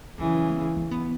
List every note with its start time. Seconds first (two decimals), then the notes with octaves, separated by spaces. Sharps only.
0.18 C#3 E3 F#3
0.55 C#4
0.77 C#4
0.91 B3